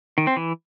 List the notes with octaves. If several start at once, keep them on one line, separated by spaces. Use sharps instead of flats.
D#3
C4
E3